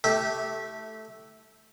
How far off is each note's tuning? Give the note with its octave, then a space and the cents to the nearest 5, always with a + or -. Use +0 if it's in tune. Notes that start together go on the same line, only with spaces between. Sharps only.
A3 -5 E4 -25 G4 -5